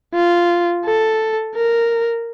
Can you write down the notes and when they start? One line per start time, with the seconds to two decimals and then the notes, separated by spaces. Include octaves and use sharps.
0.15 F4
0.85 A4
1.56 A#4